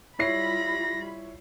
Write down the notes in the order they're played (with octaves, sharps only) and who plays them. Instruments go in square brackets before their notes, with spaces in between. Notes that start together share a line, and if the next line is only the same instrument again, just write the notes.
[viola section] G3 F4 B5 [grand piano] E4 C#5 C7 [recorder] A#6